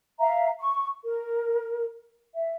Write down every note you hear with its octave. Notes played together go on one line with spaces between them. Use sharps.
E5 F5 A#5
C#6
A#4
E5